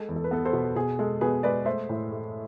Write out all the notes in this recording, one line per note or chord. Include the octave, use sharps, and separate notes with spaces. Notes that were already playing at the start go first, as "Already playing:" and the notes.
Already playing: G#3 A4
E2
A4
B4
B3 A4
A4 C5
B2
B2 G#4
G#3 A4
B2 G#4 B4
G#3 B4 D5
A3 C5 E5
A2
A3